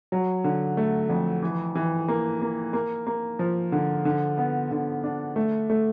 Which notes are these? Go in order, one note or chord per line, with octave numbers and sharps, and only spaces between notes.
F#3
D3
A3
F2
E3
E3
A#3
A#3
A#3
A#3
F3
D3
D3
B3
D3
D4
A3
A3